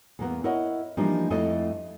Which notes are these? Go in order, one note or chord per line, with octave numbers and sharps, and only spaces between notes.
E2 A#3 B3
E4 A#4 C#5 D#5 F#5
E3 F3 G3 A#3 D4 D#4
F2 A3 E4 D#5